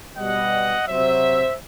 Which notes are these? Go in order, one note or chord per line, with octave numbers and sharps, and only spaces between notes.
B2 G3 D#5 F#5
C3 F#3 C5 E5